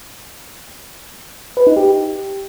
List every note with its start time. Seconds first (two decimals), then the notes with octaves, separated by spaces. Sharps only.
1.57 B4
1.67 D#4
1.77 G4